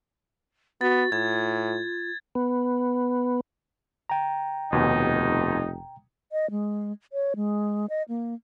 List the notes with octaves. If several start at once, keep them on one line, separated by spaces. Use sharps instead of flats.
B3 F#4 A6
A2 F4 G#6
B3
G5 A#5
F1 D#2 B2 D#4
D#5
G#3
C#5
G#3
D#5
A#3